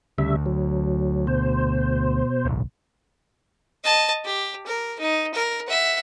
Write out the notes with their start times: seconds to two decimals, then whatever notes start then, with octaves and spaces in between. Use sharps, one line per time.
0.18 D2 C#3 G3 E5
0.46 F#3
1.27 B2 C5
2.45 D1 B1
3.84 D#5 A5
4.24 G4
4.66 A#4
4.99 D#4
5.34 A#4
5.67 E5 F#5